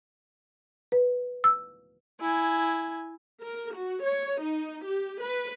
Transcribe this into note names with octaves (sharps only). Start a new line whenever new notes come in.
B4
E6
E4 G#5
A#4
F#4
C#5
D#4
G4
B4